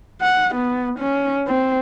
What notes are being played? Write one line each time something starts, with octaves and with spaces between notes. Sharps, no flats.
F#5
B3
C#4
C4